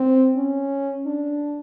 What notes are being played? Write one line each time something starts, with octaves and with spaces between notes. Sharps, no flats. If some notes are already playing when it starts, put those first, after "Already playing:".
Already playing: C4
C#4
D4